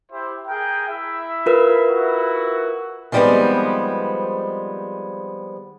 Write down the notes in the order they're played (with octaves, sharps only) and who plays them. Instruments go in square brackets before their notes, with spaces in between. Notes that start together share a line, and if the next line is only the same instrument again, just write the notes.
[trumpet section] E4 G4 C5
G#4 A#4 G5
E4 E5
[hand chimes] F4 A#4 B4
[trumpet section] E4 F#4
[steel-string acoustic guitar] D#3 F3 G3 G#3 B3 C4